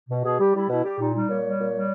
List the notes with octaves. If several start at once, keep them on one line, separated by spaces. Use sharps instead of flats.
B2
B2 G#4
G3 G4
G3 E4
B2 E4
G3 G4
A#2 D#4
G3 D#4
A#2 C#5
G3
A#2
G3